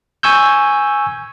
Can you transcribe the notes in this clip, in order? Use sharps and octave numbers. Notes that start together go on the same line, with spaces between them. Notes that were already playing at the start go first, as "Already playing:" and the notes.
G#5 C#6 E6 G6